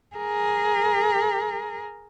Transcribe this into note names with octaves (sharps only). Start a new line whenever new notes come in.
G#4 A#4